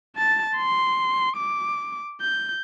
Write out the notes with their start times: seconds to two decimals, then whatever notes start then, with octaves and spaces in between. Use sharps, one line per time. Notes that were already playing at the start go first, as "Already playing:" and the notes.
0.16 A5 A6
0.56 C6
1.37 D6
2.21 G6